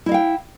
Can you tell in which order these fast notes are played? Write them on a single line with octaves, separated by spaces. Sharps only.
E4 D#5 F5 G5